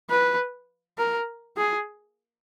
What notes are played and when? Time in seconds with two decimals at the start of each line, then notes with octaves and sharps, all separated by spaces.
0.10 B4
0.98 A#4
1.57 G#4